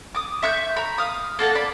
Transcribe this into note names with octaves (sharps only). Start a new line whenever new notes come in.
D6 D#6
E5 C#6 F#6 G6
A#5 B5
F5 D#6
A#3 A4 F#5 A5
D5 B5